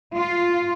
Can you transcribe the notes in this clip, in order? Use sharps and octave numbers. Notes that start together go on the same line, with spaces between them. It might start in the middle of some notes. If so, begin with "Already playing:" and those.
F4